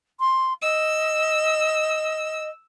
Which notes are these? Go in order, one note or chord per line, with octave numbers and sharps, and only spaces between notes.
C6
D#5 E6